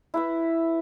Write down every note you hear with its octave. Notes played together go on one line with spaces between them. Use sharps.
E4 B4 E5